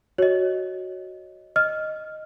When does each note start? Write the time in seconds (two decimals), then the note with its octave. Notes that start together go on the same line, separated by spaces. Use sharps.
0.18 F#4 C#5 D#5
1.56 D#5 F6